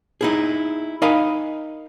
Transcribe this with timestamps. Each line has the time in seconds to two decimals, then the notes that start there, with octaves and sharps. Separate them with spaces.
0.21 D#4 E4 G#4
1.02 D#4 A#4 F5 G#5 B5